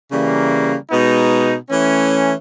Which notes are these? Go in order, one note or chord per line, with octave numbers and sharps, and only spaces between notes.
C#3 E3 G3 A#3
B2 G#3 B3 D#4
E3 A3 C#4